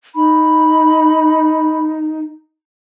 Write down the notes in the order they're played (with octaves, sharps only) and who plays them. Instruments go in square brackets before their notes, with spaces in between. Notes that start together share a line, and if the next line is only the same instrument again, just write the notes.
[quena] D#4 [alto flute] B5